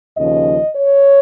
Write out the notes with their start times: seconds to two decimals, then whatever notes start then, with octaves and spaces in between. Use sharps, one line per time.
0.17 D#2 C#3 F3 D#5
0.76 C#5